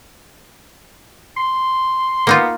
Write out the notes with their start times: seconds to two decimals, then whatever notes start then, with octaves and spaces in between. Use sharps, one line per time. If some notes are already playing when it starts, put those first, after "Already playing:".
1.37 C6
2.27 A#3 B3 D#4 F4